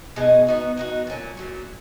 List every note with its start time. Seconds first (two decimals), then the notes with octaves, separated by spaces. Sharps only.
0.16 B2 G#3 D#4 G#4
0.47 B3 D#4 F#4
0.77 B3 D#4 F#4
1.07 A#2 F#3 C#4
1.37 A#2 F#3 C#4